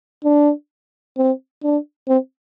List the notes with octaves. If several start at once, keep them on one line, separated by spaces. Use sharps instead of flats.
D4
C4
D4
C4